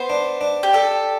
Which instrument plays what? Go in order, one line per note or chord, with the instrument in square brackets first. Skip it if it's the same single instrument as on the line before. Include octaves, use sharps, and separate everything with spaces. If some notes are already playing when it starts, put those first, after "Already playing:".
Already playing: [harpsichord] B3 [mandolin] C5
[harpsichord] D4
D4
[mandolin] G4
[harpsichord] D4 [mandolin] A4